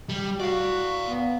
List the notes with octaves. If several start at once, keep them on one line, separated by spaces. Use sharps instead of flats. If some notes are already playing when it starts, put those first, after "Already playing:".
G3
F#4 D5 F5
B3